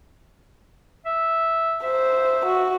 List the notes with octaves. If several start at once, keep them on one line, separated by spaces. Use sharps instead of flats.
E5
C5 E5
F#4